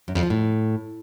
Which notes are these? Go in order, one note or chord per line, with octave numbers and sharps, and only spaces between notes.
F#2
F2
F3
A2